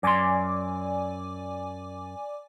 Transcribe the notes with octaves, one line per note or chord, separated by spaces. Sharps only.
F#2 D5 G#5 C6 D6